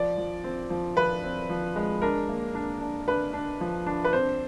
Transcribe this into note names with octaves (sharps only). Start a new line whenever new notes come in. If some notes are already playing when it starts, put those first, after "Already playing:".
Already playing: F3 D5
F3
C4
F3
F3 B4
C4
F3
G#3
D4 A#4
A#3
D4
D4
D4 B4
D4
F3
D4
B4
C4 C5